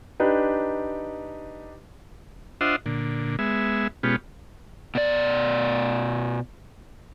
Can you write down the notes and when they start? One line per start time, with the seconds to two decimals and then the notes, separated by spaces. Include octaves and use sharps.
0.20 D4 D#4 G4 B4
2.61 D4 F4 C5 D#5 E5 F#5
2.86 A#2 D3
3.39 G#3 B3 E5
4.03 B2 G#3 B3 C#4 F4 G4
4.95 B2 D5